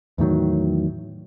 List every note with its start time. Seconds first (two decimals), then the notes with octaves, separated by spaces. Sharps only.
0.18 E2 A2 D#3 F#3